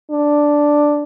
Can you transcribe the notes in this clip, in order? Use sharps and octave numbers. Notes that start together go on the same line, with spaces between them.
D4